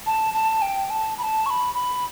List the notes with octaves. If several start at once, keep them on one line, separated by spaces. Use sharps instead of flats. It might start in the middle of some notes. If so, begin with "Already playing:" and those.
A5
A5
G5
A5
B5
A5
C#6
B5
B5